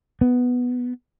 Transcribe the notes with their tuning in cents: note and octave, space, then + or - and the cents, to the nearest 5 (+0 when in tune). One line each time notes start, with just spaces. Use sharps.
B3 +0